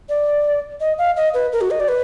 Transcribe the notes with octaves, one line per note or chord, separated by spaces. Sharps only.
D5
D#5
F5
D#5
B4
A#4
F#4
D#5
D5
B4